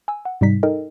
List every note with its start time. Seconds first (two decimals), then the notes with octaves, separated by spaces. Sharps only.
0.08 G#5 E6
0.25 F#5
0.41 G#2 C3 G3 D#4 B6
0.63 D#4 A4 A#4 D#5 G5